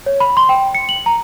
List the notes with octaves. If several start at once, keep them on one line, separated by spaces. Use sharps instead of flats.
C#5
B5
C6
G5
C#7
F#7
A#5